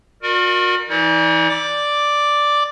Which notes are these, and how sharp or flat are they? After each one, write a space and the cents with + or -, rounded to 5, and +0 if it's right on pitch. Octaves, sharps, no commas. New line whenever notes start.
F#4 -45 A#4 +0 D5 +25
E3 +0 D#4 +45 D5 +0
D5 +0 D6 +0